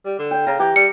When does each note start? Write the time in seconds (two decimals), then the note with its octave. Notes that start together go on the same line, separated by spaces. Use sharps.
0.05 G3
0.19 D3
0.31 G5
0.47 C#3 A#5
0.59 E3 G4
0.76 G3 C#7